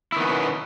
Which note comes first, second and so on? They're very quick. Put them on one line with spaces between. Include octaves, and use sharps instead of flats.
E4 D#3 B3 C#4 B2